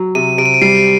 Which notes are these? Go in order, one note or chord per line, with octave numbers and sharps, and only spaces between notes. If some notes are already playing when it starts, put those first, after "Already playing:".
Already playing: F#3
C3 D#7
C3 D7
D#7
D7
G3 C7
D7